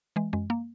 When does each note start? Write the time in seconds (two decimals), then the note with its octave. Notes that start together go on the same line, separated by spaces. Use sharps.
0.16 E3 G#3
0.33 F#2 G#3
0.50 A#3